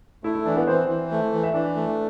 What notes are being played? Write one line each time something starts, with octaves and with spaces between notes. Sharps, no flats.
A3 E4
E4
E3 D4
B3 B4
E3 C4 C5
E3
A3
E3
E5
E3 D4 D5
A3